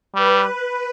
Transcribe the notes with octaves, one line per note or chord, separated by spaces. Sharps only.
G3 B4